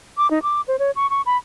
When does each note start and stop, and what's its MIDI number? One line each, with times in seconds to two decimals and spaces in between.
0.17 0.29 86
0.31 0.42 63
0.43 0.61 86
0.68 0.79 72
0.79 0.91 73
0.96 1.09 85
1.10 1.22 85
1.26 1.37 83